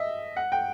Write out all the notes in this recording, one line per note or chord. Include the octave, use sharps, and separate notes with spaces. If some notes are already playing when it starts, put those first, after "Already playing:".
Already playing: D#5 E5
F#5
G5